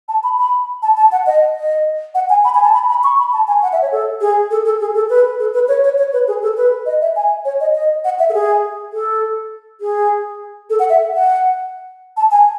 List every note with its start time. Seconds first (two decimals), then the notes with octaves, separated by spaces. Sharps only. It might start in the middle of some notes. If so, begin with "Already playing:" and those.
0.08 A5
0.23 B5
0.38 B5
0.82 A5
0.97 A5
1.12 F#5
1.26 D#5
1.56 D#5
2.15 F#5
2.30 G#5
2.44 B5
2.54 G#5
2.64 A5
2.74 B5
2.89 B5
3.04 C#6
3.18 B5
3.33 A5
3.48 G#5
3.62 F#5
3.72 E5
3.82 C#5
3.92 A4
4.21 G#4
4.51 A4
4.66 A4
4.80 G#4
4.95 A4
5.10 B4
5.39 A4
5.54 B4
5.68 C#5
5.84 C#5
5.98 C#5
6.13 B4
6.28 G#4
6.43 A4
6.57 B4
6.86 D#5
7.01 E5
7.16 G#5
7.45 C#5
7.60 D#5
7.75 D#5
8.04 F#5
8.19 E5
8.29 A4
8.33 G#4
8.93 A4
9.81 G#4
10.70 A4
10.79 F#5
10.89 E5
11.14 F#5
12.17 A5
12.31 G#5